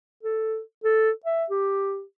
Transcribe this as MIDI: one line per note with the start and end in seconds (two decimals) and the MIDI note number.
0.23 0.60 69
0.84 1.11 69
1.25 1.45 76
1.50 2.03 67